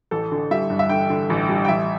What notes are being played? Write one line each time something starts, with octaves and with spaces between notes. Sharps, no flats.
A1 A4
D3
G3 E5
G2
E5
D3 G5
D3
A1
G3
G5
A1 E5